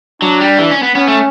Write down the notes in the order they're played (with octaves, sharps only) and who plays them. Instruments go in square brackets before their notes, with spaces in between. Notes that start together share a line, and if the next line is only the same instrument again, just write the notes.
[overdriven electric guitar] F#3 [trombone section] D4
[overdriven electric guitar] G3
E3
C#4
B3
[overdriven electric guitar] B3 [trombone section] C#4
[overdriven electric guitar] A3